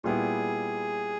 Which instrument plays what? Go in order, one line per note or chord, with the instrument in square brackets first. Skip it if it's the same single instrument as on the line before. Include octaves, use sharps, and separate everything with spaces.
[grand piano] A#2 G3 B3 E4 [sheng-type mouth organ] G#4